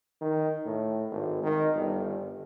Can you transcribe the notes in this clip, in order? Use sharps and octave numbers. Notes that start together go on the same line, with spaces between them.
D#3
A2
G#1
D#3
G1